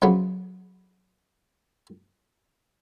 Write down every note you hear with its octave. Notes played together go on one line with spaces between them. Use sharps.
C#2 F3 F#3 B3